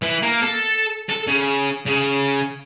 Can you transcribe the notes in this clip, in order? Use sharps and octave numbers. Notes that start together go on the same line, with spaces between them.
E3
A#3
A4
A4
C#3
C#3